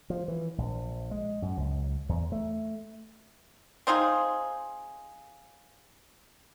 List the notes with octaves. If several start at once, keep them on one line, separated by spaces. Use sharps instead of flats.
F3
E3
A#1
G#3
F#2
C#2
E2
A3
C4 D#4 F4 G#4